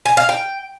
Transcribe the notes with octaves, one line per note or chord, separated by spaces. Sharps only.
G#5
F5
G5